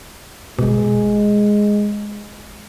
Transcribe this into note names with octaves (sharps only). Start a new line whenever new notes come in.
G1 B2 G#3